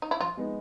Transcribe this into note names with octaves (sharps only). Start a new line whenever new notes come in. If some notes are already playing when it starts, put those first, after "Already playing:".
D#4
E4
F3 F4
G#3 B3 D#4